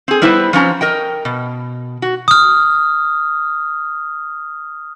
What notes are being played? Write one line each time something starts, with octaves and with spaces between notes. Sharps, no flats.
C4 G#4
G3 B3 E4 B4 C5
F3 C4 C#4 A#5
A#4 D#5 G5
B2
F#4
D#6 F6